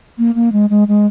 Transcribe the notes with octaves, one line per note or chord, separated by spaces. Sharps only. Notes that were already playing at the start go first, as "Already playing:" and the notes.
A#3
A#3
G#3
G#3
G#3